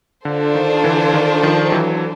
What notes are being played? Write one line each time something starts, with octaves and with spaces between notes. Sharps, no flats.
D3 D4 F4 A4 C5
D#3
D3 E3
D#3
D#3 F3
E3 F#3